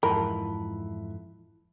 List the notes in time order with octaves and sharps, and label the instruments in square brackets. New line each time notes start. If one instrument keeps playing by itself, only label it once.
[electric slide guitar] F2 G#2 E3 [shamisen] A#4 [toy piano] A5 B5